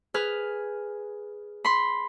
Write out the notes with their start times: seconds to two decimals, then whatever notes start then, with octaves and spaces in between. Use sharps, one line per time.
0.14 G#4 B4 F6
1.64 B5 C6